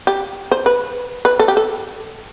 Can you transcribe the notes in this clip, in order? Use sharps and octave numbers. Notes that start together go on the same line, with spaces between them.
G4
C5
B4
B4
A4
G4
A4